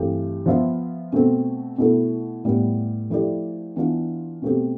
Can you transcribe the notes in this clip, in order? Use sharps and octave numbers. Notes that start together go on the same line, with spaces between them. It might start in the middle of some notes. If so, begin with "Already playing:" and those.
Already playing: G2 E3 A3 C4 G4
F3 B3 F4 C5 E5
B2 A3 C4
B2 A3 E4 A4
A2 G3 B3
F3 A3 E4 G4 D5
E3 B3 D4 F4
B2 A3 C4 G4